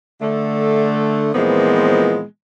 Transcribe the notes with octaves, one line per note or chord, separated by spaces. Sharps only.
D3 A3
A#2 E3 F3 G#3 B3 C4